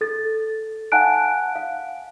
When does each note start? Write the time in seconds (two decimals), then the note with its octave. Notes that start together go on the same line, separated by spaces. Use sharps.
0.01 A4 A6
0.92 F5 F#5 G#5 A5 F#6 D7
1.56 F5